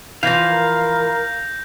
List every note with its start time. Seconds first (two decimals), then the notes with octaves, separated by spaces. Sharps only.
0.23 E3 F3 F5 G6 A#6
0.46 A#4